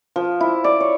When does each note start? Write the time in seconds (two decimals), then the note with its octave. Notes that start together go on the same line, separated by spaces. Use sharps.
0.16 F3
0.40 E4
0.64 D5
0.80 C#5